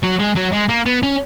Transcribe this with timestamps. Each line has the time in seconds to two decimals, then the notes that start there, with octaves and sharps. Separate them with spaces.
0.03 F#3
0.19 G#3
0.36 F#3
0.53 G#3
0.69 A#3
0.86 B3
1.03 C#4